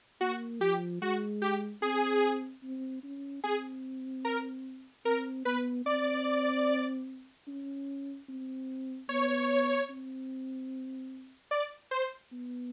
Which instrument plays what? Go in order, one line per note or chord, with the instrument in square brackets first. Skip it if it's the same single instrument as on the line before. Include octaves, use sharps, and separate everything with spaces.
[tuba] A#3 [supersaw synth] F#4
[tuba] F3 [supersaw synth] G4
[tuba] G#3 [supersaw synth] F#4
[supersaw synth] G4
[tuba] C4 [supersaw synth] G#4
[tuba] C4
C#4
[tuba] C4 [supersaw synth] G#4
[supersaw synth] A#4
[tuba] C4 [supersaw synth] A#4
[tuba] B3 [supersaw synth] B4
[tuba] C4 [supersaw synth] D5
[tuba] C#4
C4
[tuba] B3 [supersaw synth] C#5
[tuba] C4
[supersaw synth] D5
C5
[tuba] B3